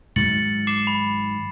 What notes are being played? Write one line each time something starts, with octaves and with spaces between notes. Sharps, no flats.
G#2 D#3 F#3 A6 C#7 F#7
D6 C7 E7
B5